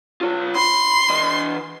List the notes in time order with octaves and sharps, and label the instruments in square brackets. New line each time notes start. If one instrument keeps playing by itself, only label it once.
[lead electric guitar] F4 C#5
[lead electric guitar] B5 [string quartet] C6
[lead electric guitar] E3 D#5